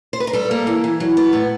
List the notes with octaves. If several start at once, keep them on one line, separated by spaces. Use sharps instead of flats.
C5
B4
A#4
G3 A4
A#3
E3
E3
F#3
B3
A2